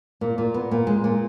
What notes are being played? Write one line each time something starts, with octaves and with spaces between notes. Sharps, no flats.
A#2
A#2
B3
A#2
G#3
A#2